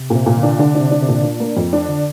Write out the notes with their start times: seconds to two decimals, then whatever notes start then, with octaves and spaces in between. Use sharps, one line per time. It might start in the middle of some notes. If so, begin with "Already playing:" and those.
Already playing: C3
0.10 A#2
0.16 C3
0.26 A#2
0.37 D3
0.43 D4
0.59 D3 D4
0.75 D4
0.80 C3
0.91 D4
1.02 C3
1.08 A#2
1.23 D4
1.40 A#3
1.57 F2
1.73 D4
1.89 D3